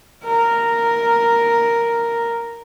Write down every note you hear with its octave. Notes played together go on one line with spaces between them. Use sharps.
A#4